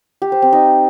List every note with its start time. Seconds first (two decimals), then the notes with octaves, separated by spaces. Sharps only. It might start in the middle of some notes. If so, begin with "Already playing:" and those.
0.22 G4
0.32 C5
0.42 C4
0.53 D#4